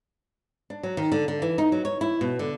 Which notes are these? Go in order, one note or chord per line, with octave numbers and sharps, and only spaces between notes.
D4
F#3
D#3
D3
D3
E3
D#4
F#3
C#5
E4
B2
D3